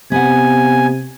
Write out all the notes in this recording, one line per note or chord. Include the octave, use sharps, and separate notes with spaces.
C3 B3 F#5 G#5